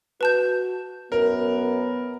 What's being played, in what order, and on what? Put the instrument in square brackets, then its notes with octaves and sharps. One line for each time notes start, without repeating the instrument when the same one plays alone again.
[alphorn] F#4 [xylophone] B4 A5 G6
[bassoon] F#2 [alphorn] B3 [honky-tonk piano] A#4